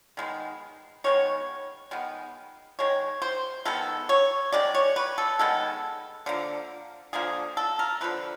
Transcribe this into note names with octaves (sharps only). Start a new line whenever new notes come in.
D#3 G#3 B3
D#3 G#3 B3 C#5
D#3 G#3 B3
D#3 G#3 C#5
C5
D#3 G#3 B3 A4
C#5
D#3 G#3 D5
C#5
B4
A4
D#3 G#3 B3 A4
D3 F3 A#3
D3 F3 A#3 G#4
A4
A#4
D3 F3 A#3 B4